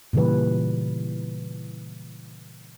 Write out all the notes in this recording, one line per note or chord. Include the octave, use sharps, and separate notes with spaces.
A#2 C#3 E3 G3 B4